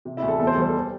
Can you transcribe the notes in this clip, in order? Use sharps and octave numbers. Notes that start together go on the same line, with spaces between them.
C3
E4 E5
D2
A4
E2 A4
C5
A4
G3 C5
A4